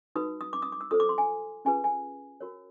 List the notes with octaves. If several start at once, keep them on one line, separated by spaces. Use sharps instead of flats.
D#4 F#4 B4 D#6
D#6
D6
D#6
D6
E6
F4 A4 C5 D#6
D6
C6
G#5
C#4 F4 G#4 B4 G#5
G#5
F#4 A#4 C#5